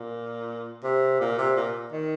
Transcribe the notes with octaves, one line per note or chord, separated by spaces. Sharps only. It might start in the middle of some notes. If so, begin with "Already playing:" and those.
Already playing: A#2
C3
A#2
C3
A#2
D#3